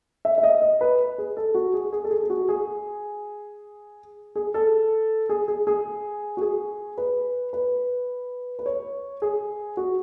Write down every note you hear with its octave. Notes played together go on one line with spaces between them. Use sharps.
E5
E5
D#5
D#5
B4
G#4
A4
F#4
G#4
G#4
A4
G#4
G#4
F#4
G#4
G#4
A4
G#4
G#4
G#4
F#4
G#4
B4
B4
B4
C#5
G#4
F#4